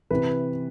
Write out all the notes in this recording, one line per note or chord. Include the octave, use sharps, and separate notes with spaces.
C3 E3 B4